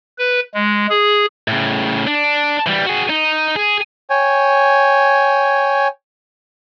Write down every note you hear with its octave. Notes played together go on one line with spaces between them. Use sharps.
B4
G#3
G#4
A2 C#3
D4
E3 G3
F#4 G#4
D#4
G#4
C#5 G5 G#5